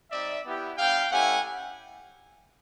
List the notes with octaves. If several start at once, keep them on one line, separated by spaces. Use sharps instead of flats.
G3 C4 D#4 D5 E5
B3 E4 G4
G3 B3 D4 F5 G5
A3 C#4 E4 G4 F#5 G#5